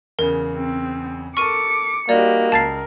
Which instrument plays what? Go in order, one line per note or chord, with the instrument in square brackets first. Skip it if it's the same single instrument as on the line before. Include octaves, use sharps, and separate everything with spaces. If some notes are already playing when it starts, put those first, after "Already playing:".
[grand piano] E2 C#3 [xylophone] A#4
[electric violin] C4
[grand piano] A4 A#4 F6 [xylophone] C#6 D#7 [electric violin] D6 C#7
[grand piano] G3 D#4 [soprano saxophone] A#3 [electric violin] F#4 G4 [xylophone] D5
[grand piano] C#2 [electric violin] A#4 [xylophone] A5 A6 C7